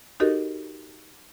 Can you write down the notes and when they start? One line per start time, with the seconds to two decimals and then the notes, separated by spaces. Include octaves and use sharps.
0.20 D#4 F#4 G4 A4 A#4 D#5